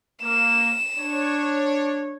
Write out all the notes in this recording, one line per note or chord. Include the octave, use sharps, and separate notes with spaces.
A#3 E7
D4 C#5